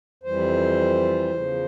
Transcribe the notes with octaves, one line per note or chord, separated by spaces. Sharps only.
F2 E3 G3 C5
E2 C#3 F3